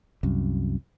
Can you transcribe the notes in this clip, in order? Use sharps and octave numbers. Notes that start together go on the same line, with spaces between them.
C2 F#2